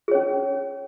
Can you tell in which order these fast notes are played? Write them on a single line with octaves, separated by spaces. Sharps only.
G#4 C#5 C#4